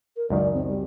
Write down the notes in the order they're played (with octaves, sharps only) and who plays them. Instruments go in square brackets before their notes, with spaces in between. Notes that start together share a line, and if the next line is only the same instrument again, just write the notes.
[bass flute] A#4
[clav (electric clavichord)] C#2 F#2 D#3 [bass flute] D5
[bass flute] C4
G3